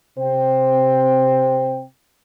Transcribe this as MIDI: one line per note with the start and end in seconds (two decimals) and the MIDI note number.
0.18 1.81 48
0.18 1.81 72
0.18 1.81 79